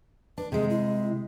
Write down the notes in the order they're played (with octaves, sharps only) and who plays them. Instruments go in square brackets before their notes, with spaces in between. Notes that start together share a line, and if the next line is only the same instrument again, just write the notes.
[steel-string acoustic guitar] D4 [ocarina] B4
[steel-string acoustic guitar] C3 G#3 [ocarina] G#4
[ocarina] E4